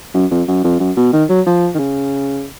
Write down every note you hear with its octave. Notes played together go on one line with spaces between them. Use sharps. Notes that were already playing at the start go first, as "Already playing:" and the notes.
F#2
F2
F#2
F2
F#2
B2
D#3
F#3
F3
D#3
C#3